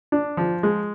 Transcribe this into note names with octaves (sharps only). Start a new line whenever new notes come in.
D4
F3
G#3